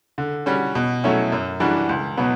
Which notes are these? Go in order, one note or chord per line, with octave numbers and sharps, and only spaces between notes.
D3
G3 C#4 F#4
B2
F#3 A3 C#4 E4
F#2
E3 G3 D4 F#4
C#2
B2 F#3 B3